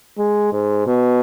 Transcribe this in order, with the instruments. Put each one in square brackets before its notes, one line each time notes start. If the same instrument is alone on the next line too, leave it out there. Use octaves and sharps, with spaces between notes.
[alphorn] G#3
G#2
B2